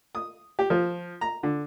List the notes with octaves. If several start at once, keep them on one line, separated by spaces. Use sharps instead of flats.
D#6
G4
F3
A#5
D3